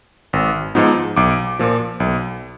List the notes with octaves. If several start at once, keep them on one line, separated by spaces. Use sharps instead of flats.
G#1
G#2 F3 B3 D#4
B1 D6
A#2 F3
B1